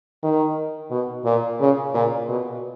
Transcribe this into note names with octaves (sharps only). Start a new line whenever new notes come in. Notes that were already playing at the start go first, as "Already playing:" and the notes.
D#3
B2
A#2
C#3
A#2
B2